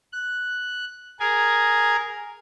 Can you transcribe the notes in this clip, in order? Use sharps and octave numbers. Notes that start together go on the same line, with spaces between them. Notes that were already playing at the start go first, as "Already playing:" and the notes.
F#6
G#4 A#4 G#5